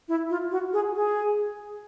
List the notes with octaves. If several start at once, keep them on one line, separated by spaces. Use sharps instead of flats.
E4
F4
F#4
G#4
G#4